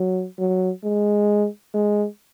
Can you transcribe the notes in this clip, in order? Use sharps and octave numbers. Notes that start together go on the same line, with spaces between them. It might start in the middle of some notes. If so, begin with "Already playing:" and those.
Already playing: F#3
F#3
G#3
G#3